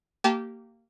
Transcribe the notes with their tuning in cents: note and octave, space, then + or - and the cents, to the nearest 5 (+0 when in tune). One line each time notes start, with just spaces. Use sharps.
A#3 -20 G4 -20 A5 -40